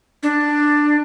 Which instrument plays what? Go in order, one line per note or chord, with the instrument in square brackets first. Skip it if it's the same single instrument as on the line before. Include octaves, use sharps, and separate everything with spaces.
[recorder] D4